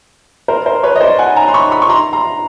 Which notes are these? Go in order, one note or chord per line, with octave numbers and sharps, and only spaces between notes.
A#4 C5
A#4 C5
B4 C#5
D#5
C5 D5
F#5 G#5
G#5 A#5
C6
B5 C#6
B5 C#6
C#6
A#5 C6
A#5 C6